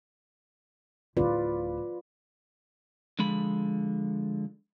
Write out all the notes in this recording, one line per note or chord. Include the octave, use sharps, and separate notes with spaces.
D1 E4 F4 B4 D5
D3 F3 G#3 B5